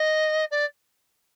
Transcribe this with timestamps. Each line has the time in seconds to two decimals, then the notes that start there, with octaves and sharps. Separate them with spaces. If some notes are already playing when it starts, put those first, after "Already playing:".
Already playing: D#5
0.51 D5